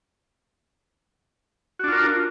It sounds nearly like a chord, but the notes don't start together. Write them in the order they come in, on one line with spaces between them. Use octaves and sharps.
F#4 D4 F4 A#4